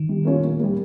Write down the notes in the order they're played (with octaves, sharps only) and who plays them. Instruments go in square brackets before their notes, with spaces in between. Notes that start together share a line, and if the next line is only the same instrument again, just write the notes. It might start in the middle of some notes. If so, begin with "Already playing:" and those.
Already playing: [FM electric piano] D#3
[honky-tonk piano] G3
A#3 C#4 F4
A#2
G3 A#3